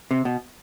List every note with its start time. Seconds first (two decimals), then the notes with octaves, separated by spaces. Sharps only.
0.11 C3
0.25 B2